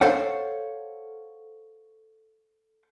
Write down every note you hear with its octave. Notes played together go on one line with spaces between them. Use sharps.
A4 C5 C#5 F5 F#5